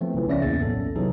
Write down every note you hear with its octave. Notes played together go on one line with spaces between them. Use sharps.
E3 F3 A3 B3 C4
B1 C#3 E3 F3
C#2 C#3 C#4 D5 E5 A#6
E2 A2 A#3 B3 A6
B1 C#4 A4
C3 E3 F#3 D#4 G#4 A4